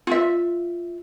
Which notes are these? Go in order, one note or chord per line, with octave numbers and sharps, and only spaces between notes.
F4 E5